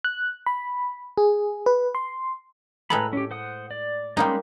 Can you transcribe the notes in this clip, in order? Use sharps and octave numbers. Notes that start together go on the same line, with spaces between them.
F#6
B5
G#4
B4
C6
A2 G#3 A4 B4 A#5 B5
C#4 G4
C5 F#5 D#6
D5
G3 G#3 A#3 C#4 D#4 C6